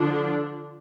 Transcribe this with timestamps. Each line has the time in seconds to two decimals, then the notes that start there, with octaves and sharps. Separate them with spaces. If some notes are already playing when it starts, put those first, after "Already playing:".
Already playing: D3 F3 D4